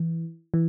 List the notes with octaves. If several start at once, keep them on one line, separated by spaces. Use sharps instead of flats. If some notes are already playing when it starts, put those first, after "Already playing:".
Already playing: E3
E3